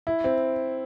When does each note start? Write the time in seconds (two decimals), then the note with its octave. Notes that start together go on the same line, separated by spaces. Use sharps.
0.07 E4
0.24 C4